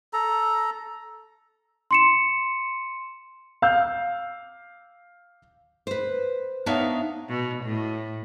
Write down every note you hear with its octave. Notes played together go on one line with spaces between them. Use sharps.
A4 A#5
C6 C#7 E7
F5 E6 G6
B4 C5
B3 D4 D#4 C#5 E5 F5
B2
A2